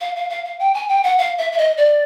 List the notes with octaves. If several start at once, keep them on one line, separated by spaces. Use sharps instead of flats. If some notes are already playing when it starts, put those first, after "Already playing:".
F5
F5
F5
F5
G5
G#5
G5
F#5
F5
E5
E5
D#5
D5